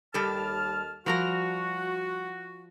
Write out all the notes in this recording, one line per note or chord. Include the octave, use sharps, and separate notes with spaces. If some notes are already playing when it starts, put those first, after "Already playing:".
D#2 G3 G4 A4 A5 F6
F3 G3 F#4 A#4 A#5